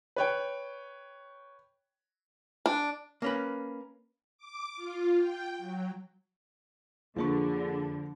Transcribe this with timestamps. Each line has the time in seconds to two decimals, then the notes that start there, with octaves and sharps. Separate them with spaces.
0.16 B4 C#5 G5
2.66 D4
3.22 A#3 C#4 B4
4.38 D6
4.76 F4
5.17 G5
5.58 F#3
7.16 F2 D3 F3 A#3 D4 G#4 B5 C#6